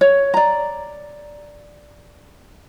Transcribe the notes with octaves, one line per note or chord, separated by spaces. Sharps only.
C#5
D5 A#5